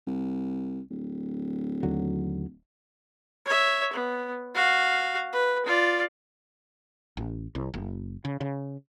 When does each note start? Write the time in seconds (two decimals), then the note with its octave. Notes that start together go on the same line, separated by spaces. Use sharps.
0.07 C2
0.91 D1
1.83 D#2 D3 F#3
3.45 C#5 E5
3.93 B3
4.54 F#4 F5
5.33 B4
5.66 F4 D5
7.17 A1
7.55 C2
7.74 F#1
8.25 C#3
8.41 C#3